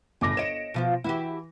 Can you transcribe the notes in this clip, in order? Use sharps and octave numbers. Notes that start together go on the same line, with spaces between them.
G1 A2 C#3 D6 A#6
C#5 D#5 C#7 D7 E7
B2 F3 F4
E3 E4 F#4 G4